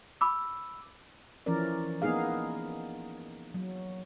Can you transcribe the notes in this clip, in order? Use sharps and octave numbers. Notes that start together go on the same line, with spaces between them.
B5 D6 E6
E3 F3 C#4 A#4 D5
A#3 B3 D#4 G#4 F5
F#3